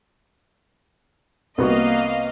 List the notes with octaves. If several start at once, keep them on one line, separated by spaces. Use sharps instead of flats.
C2 A#3 B3 F#4 D#5 F5